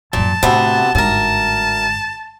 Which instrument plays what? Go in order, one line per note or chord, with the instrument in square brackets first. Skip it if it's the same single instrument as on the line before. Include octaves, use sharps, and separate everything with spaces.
[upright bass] A1 F#2 [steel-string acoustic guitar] A#2 [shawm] A5
[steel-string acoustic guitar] D2 C3 B3 [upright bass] A2
[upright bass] G1 G#2 [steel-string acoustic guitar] D2 A#4 [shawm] A5